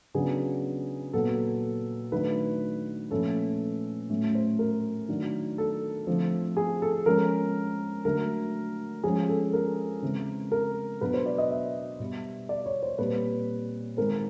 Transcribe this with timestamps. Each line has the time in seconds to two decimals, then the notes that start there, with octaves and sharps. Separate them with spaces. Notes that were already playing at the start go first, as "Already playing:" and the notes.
0.14 C#3 F#3 B3 D4 G#4
1.13 A#2 F#3 B3 A4
2.12 D#3 F#3 A3 D4 B4
3.10 A#2 F3 A3 C#4 A4
4.10 A2 F#3 A3 C#4
4.35 C5
4.59 A#4
5.08 D#3 F#3 A3 D4
5.58 A4
6.07 D3 F3 A3 C4
6.57 G#4
6.82 A4
7.06 F3 G#3 C#4 A#4
8.05 D3 F#3 A3 A#4
9.04 F3 G#3 C#4 G#4
9.29 A4
9.53 A#4
10.02 C#3 E3 G#3 C4
10.52 A#4
11.01 B2 F#3 B3 D4 B4
11.14 C5
11.26 D5
11.38 D#5
11.51 E5
12.00 B2 G3 B3
12.49 D5
12.66 C#5
12.83 C5
12.98 A#2 G3 C4 B4
13.97 D#3 G#3 C4 A#4